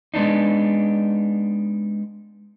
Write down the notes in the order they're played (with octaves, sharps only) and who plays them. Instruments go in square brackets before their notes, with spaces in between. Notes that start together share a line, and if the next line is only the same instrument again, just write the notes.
[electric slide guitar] G#3 B3 D4 D#4